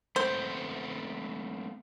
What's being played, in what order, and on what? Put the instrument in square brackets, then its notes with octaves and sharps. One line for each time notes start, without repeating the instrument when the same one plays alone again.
[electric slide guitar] A3 B3 C4 [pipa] C5